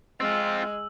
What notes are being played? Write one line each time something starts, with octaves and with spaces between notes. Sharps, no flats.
G#3 C4 F4 E6